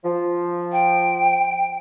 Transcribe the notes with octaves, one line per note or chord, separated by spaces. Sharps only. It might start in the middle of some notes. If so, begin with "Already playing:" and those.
F3
G5